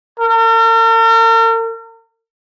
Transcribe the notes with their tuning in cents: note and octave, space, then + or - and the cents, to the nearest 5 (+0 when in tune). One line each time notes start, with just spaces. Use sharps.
A#4 -45